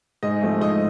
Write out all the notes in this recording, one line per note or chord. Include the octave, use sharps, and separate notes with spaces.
G#2 D#5
F3 A3
G#2 D#5